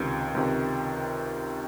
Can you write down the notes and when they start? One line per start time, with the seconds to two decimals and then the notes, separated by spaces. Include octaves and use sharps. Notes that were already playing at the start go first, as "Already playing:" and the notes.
Already playing: C#2 C3 D#3
0.35 C#2 C3 D#3